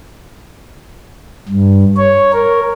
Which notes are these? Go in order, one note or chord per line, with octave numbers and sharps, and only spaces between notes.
G2
C#5
A#4